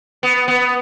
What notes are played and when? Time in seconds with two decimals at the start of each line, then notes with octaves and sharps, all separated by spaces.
0.23 B3
0.48 B3